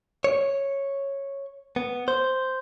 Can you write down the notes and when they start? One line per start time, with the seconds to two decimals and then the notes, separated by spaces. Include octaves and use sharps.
0.24 C#5
1.76 B3
2.08 C5